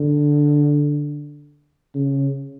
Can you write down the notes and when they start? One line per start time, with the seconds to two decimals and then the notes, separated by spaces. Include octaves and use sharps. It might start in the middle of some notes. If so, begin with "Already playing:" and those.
Already playing: D3
1.95 C#3